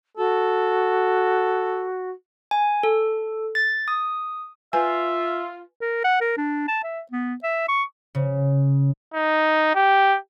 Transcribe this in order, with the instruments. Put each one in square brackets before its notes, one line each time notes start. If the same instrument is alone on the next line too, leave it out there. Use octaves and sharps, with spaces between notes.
[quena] F#4 [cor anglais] A4
[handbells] G#5
A4
A6
D#6
[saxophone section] F4 [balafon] B4 G#5 [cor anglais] E5
[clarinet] A#4
F#5
A#4
D4
A5
E5
B3
E5
C#6
[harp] C#3
[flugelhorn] D#4
G4